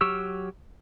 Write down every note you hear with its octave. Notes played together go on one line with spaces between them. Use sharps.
F#3 G4 C#6 E6 F6